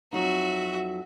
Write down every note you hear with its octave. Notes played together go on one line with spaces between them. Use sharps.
F2 F#3 D#4 F#4 E5